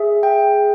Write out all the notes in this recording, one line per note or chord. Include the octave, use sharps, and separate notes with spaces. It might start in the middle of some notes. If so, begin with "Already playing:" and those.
Already playing: G#4 E5
G5